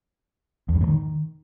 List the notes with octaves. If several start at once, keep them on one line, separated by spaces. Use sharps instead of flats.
E2
G2
A2
D#3